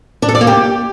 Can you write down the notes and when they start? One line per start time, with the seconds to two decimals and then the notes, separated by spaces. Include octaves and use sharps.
0.22 D4
0.29 A4
0.35 D5
0.41 A#3
0.47 G4